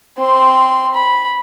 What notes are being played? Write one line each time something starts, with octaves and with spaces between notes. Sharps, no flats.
C4 C6
B5